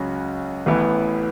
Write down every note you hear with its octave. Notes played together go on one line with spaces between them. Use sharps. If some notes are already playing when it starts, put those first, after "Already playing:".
Already playing: C#2 C#3 F#3 C#4 F#4
A1 A2 E3 B3 E4